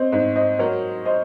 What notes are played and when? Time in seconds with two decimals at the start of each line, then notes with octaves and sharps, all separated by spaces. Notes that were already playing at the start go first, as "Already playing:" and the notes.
Already playing: C4 C5 C#5 D#5
0.12 G#2 C5 D#5
0.36 C5 D#5
0.59 F#3 A#4 C#5
1.05 C5 D#5